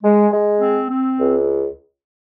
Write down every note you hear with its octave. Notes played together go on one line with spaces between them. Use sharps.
G#3
G#3
C4
C4
C#2